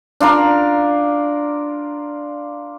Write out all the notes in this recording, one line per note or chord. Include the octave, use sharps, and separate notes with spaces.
D4 F4 A#4 A#5